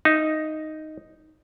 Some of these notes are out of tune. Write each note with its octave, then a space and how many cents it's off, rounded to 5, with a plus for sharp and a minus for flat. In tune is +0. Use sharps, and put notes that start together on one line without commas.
D#4 +0 E5 +25